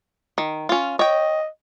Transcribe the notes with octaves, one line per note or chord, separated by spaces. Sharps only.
D#3
C#4 F4
C#5 D#5 G5